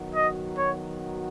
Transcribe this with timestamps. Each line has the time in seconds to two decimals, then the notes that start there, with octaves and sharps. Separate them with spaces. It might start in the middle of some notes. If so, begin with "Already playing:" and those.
Already playing: D#3 F#3 B3 F#4
0.15 D#5
0.58 C#5